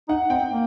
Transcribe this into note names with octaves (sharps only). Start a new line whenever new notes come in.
D#4 F#5
C4 G5
A#3